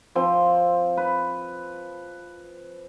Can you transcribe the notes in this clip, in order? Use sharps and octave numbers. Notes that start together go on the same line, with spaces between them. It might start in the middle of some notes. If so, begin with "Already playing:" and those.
F3 C4 C6
B4